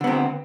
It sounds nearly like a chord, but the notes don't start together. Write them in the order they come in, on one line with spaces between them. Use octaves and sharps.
D3 B3 C4